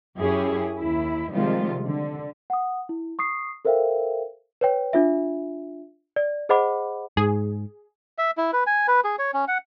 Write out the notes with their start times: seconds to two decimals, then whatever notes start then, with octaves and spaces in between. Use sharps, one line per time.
0.20 F#2 C#4 E4 G4 G#4
0.78 D#2 E4
1.31 C3 D#3 F3 G3 G#3 F4
1.86 D3
2.50 F#5 D#6
2.89 E4
3.19 C#6 D#6 C7
3.65 A4 A#4 C5 E5 F5 G5
4.61 B4 C#5 G5
4.93 D4 F4 E5
6.16 D5
6.49 G#4 C5 D#5 F#5 B5 D6
7.17 G#2 G#4
8.18 E5
8.37 E4
8.53 B4
8.67 G#5
8.88 B4
9.04 G#4
9.19 C#5
9.34 C#4
9.48 F#5